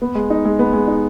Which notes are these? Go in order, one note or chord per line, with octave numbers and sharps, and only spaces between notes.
B3
G#3
D#4
G#3
B3
G#3
D#4